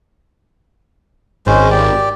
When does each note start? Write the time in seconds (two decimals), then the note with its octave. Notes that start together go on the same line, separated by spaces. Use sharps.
1.47 G#1 G#3 C#4 C5
1.71 G4 D5 G5